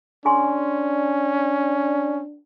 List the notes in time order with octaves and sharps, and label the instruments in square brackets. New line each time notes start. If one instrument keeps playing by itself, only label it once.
[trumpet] C#4 [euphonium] D4 [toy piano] G#4 G#5 C6